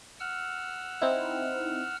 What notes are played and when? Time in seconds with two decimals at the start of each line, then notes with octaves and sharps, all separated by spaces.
0.20 F#5 E6 F6
1.02 C4 D#4 E4